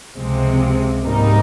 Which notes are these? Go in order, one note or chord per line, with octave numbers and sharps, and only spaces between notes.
C#2 C3 F3 G#3 C4
G#2 G3 A#3 D#4